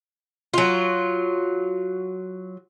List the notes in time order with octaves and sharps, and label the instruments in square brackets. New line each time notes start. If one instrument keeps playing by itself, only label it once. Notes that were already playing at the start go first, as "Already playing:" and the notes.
[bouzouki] F#3 F4